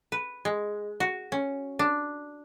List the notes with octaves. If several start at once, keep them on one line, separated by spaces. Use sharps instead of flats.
B4
G#3
F#4
C#4
D4